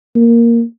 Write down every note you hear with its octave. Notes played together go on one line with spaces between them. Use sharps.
A#3